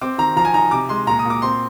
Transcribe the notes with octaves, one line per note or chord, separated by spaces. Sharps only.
C4 D6
D#3 A#5
F3 A#5
G#5
D#4 A#5
C3 D6
G#3 C6
A#2 A#5
D#6
A#2
D6
C4 C6